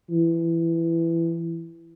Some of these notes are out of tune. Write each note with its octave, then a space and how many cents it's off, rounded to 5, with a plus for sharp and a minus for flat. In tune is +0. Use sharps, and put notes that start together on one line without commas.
E3 +15